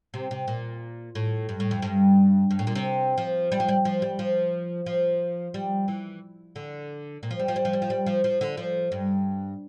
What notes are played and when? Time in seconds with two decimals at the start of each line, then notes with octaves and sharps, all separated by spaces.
0.14 C3
0.31 C3
0.48 A#2
1.15 A2
1.49 G2
1.60 A2
1.71 F2
1.82 G2
2.51 G2
2.59 A2
2.67 A#2
2.75 C3
3.18 F3
3.52 G3
3.60 F3
3.69 G3
3.85 F3
4.02 G3
4.19 F3
4.86 F3
5.54 G3
5.88 E3
6.56 D3
7.23 A#2
7.31 F3
7.39 G3
7.48 F3
7.56 G3
7.65 F3
7.73 G3
7.82 F3
7.90 G3
8.06 F3
8.24 F3
8.41 D3
8.57 F3
8.92 G2